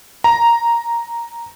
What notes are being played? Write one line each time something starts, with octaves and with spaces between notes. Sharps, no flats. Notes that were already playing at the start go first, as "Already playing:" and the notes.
A#5